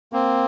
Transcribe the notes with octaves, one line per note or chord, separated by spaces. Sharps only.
A#3 C4